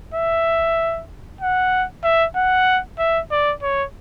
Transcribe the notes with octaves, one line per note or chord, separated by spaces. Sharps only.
E5
F#5
E5
F#5
E5
D5
C#5